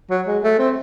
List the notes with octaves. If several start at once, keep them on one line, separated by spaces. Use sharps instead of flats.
F#3
G#3
A3
C4